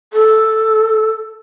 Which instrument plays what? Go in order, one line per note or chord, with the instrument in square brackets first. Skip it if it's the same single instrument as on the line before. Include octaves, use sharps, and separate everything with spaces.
[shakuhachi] A4